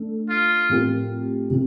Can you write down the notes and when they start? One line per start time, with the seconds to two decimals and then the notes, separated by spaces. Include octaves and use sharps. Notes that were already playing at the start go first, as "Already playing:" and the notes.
Already playing: A3 D4 A4
0.30 F4
0.69 A2 F3 C4 G4 A#4
1.50 C3 F3 C4